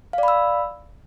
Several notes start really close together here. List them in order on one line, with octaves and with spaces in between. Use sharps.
F5 D5 B5 E6